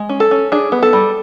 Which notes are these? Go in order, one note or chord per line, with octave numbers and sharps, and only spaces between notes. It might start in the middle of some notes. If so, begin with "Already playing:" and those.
Already playing: G#3
C#4
A4
C#4
D4 G#4
B3
A4
G3